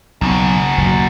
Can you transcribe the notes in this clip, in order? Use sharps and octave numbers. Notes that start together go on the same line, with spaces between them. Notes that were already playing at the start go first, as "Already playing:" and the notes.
B1 F#2 C#3
F#1 D#2 B2